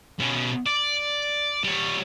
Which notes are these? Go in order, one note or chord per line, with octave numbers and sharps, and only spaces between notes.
B2 C#4
D5
G3 C#5